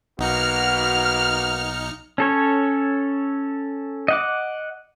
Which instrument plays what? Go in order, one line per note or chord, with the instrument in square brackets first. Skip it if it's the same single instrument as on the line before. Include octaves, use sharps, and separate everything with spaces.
[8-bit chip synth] B1 D#4 C#7 [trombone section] A#3 B3 F#4 [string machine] F6
[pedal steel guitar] C#4 A4 C#5
D#5 F#5 D6